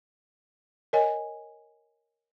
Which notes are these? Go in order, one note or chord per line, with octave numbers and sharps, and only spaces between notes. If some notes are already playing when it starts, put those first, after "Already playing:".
A#4 C#5 D#5 G#5